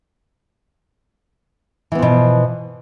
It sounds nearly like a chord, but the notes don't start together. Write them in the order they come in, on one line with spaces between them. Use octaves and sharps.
E3 B3 F3 B2